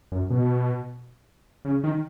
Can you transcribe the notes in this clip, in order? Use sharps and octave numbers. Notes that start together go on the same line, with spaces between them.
F#2
B2
C#3
D#3